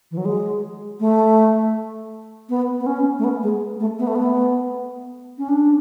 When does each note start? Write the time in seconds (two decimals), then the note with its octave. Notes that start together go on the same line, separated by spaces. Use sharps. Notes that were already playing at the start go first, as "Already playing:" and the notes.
0.11 E3
0.17 F#3
0.25 G#3
1.00 A3
2.49 B3
2.80 B3
2.86 C#4
3.18 A3
3.24 B3
3.42 G#3
3.80 A3
3.99 B3
4.07 A3
4.15 B3
5.38 C#4
5.49 D4